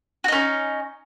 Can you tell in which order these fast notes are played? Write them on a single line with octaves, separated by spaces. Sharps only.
F#4 D#4 C#4